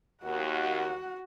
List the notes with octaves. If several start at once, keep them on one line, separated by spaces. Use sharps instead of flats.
D#2 F#4 F#5